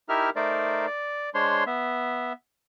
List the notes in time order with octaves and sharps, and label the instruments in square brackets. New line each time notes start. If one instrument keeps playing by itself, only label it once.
[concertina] D#4 E4 G4 A#4 E5 F6
A3 D#4 A#4 C5 D5
D5
G#3 D4 C5 C#5 C6
B3 E5